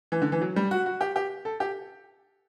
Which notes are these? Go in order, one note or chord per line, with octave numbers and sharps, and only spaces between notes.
E3
D3
E3
F#3
G3
F#4
F#4
G4
G4
A4
G4